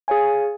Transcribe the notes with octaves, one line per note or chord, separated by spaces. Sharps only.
G#4 C#5 F5 G#5